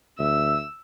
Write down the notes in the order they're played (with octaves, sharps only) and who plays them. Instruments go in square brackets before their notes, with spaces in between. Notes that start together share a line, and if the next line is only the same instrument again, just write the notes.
[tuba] D2 [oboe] E5 [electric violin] E6